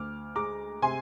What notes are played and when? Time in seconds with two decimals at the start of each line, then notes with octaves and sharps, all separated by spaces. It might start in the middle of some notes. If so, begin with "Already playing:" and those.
Already playing: D2 D6 F6
0.36 G#3 A#5 D6
0.82 C3 G#5 C6